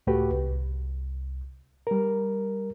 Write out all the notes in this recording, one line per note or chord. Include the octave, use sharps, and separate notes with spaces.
C#2 A2 A3 F#4 G4 B4
C2
G3 A#4